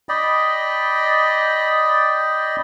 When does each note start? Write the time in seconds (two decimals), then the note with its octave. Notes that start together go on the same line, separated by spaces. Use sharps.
0.09 D5 D#5 G5 B5